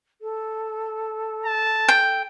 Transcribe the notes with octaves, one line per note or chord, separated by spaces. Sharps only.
A4
A5
G5